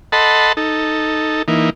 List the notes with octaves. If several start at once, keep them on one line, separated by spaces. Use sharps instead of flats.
A4 D#5 F#5 A5 B5 C6
D#4 A4
E3 A#3 D#4